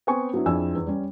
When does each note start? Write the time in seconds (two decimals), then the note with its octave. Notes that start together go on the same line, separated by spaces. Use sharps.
0.07 B3 C4 C5 G#5 C#6
0.34 F#3 B3 D4 E4
0.46 F2 D4 E4 G#4 G#5 E6
0.75 E2
0.86 G3 C#4